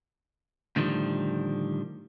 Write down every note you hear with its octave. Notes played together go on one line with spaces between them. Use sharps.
A2 D3 D#3 F3 G3